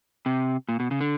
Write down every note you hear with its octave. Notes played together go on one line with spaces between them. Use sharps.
C3
A#2
B2
C#3
D3